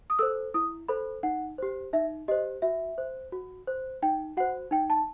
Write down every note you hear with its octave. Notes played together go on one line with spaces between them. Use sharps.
D#6
A4 C5 E6
E4 D#6
A4 C5 B5
D#4 F#5
G4 C5
D#4 E5
G4 C5 D#5
F#4 E5
C5
F#4
C5
D#4 G5
F#4 C5 F#5
D#4 G5
A5